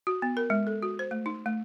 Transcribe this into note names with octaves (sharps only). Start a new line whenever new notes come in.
F#4
B3
A#4
G#3
A4
F#4
C5
A3
D#4
A3